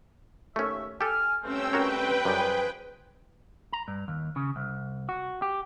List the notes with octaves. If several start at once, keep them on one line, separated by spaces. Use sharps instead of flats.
D#2 A3 C#4 E5
G4 A4 G#5 F6
G2 A3 C4 C#4 G5 E6
F#4 A#4 B4 C#5 G5
F#2 F3 G3 G#4 C5
A#5
G2
D#2
C#3
C2
F#4
G4